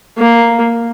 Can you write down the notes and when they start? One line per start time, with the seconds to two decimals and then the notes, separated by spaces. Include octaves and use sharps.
0.18 A#3